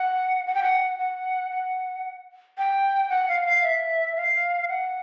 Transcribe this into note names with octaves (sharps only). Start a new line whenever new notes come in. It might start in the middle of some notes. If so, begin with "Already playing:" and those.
Already playing: F#5
F#5
G5
F#5
F#5
F#5
G5
F#5
F5
F5
E5
F5
F#5